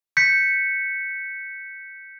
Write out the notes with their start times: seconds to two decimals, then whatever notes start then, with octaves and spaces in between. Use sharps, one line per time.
0.17 G6 B6 C#7